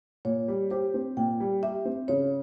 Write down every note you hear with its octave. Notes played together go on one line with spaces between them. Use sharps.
A#2 C#5
G3
G4 C5
C4
A#2 G5
G3
G4 E5
C4
C#3 C#5